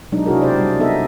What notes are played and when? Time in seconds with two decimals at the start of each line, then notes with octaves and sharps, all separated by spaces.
0.12 B2 F#3 G#3 D4 D#4
0.26 C3 D4 E4 F#4 G#4 A#4
0.41 D4 G4 C5 D5
0.57 G3
0.79 B3 D#4 A4 D#5 E5